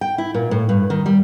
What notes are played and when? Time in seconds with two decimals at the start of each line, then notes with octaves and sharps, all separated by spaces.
0.01 G5
0.18 E4
0.34 A#2
0.51 A2
0.69 G2
0.90 D#3
1.06 G3